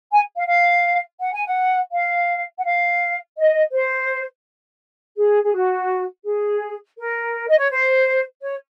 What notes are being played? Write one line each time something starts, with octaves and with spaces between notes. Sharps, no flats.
G#5
F5
F5
F#5
G#5
F#5
F5
F#5
F5
D#5
C5
G#4
G#4
F#4
G#4
A#4
D#5
C#5
C5
C#5